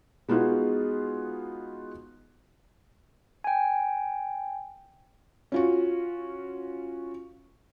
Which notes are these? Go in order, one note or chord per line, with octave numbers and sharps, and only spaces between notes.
G#3 B3 D#4 F4 F#4 G#4
G5 G#5
C#4 F4 F#4